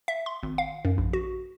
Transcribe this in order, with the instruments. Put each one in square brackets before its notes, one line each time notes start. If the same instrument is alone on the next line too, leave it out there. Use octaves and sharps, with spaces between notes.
[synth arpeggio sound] E5
C6
G#1
F5
F#2
A#1
F#4